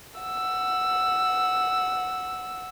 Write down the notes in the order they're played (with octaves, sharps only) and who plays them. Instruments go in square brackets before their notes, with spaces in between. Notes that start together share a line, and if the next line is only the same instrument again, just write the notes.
[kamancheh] F#5 E6